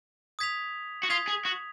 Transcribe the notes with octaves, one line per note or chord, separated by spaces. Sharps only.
D#6 G#6 B6 F7
F#4
F4 D#6 G#6 B6 F7
G#4
F#4